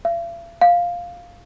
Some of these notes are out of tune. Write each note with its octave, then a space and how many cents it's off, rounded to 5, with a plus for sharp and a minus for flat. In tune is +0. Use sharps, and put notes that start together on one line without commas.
F5 -45
F5 +5